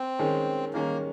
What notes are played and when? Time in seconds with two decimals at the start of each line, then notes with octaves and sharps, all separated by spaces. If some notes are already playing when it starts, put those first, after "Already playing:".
Already playing: C4
0.19 D#3 G#3 C#4
0.74 D#3 G#3 A#3 C#4